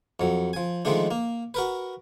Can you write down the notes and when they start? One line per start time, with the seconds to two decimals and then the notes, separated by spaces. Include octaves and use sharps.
0.20 F2 F#3
0.53 F3 G#5
0.85 D#3 F3 G#3 A3 D4
1.11 A#3
1.54 F#4 A#4 B4